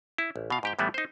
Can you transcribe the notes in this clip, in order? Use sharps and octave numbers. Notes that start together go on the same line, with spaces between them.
E4
A1
B2 F5
G#2 G4 G5
A2 E3 G3 A3 B3
D#4 C5